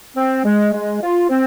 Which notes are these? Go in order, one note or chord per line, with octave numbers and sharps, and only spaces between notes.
C4
G#3
G#3
F4
C4